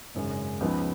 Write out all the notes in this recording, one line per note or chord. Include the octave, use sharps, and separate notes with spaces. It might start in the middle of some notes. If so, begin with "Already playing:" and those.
G#1 F#2 C#3 G#3
C#2 C#3 F3 B3 D#4